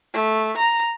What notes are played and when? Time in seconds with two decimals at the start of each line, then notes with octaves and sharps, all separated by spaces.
0.14 A3
0.57 A#5